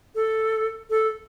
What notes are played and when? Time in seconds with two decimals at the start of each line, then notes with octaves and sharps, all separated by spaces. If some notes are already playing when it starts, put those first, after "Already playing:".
0.15 A4
0.90 A4